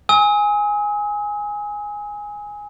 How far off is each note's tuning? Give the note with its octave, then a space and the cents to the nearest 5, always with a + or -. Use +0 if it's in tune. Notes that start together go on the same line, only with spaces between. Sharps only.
G#5 -5 D#6 +45